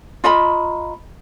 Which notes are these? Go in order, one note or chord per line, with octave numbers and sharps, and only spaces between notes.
F4 D#5 A#5 B5